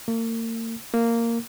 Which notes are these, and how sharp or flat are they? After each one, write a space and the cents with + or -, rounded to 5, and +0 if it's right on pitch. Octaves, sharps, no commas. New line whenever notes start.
A#3 -40
A#3 -10